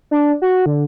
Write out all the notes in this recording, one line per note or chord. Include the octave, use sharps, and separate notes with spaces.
D4
F#4
D3